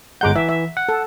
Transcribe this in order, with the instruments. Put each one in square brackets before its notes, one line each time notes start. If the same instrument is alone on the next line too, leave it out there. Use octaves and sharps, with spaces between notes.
[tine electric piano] G1 G#3 G6 [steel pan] F#5 A#5 D6
[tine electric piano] E3 [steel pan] E5
[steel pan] E5
[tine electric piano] F#5
[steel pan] A4